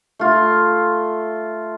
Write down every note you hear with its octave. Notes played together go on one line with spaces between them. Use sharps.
A3 F4